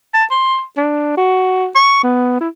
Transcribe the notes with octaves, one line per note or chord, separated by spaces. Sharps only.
A5
C6
D4
F#4
C#6
B3
E4